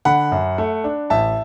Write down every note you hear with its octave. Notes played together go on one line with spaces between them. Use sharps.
D3 F#5 B5
F#2
A3
D4
A1 E5 A5